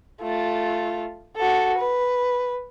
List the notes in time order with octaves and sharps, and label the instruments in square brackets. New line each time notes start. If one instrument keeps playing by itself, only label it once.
[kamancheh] A3 F4
F#4 A4
B4